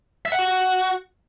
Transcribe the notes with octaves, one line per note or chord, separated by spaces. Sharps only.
E5
F#5
F#4